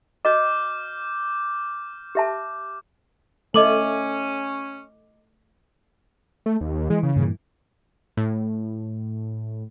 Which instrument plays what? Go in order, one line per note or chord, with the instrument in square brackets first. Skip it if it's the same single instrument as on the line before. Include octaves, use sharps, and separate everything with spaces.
[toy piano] F#4 D#5 [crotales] D6 F6 G6
[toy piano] G4 E5 A5
[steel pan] A3 [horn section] C#4 [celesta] D#5 D6 F#7
[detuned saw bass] A3
D#2
[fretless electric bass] E3 [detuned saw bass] G#3
[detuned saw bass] C#3
[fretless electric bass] G2 A#2 E3
[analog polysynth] A2